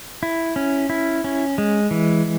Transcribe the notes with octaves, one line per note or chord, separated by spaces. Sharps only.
E4
C#4
E4
C#4
G#3
E3